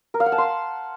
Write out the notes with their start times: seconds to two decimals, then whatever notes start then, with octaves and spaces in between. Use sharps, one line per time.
0.14 A#4
0.20 F5
0.26 F#5
0.32 A5
0.38 C6